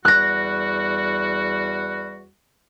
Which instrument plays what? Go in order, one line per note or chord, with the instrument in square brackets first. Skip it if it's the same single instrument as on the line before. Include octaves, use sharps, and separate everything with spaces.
[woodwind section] E2 G3 F#4 [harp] F#6 A#6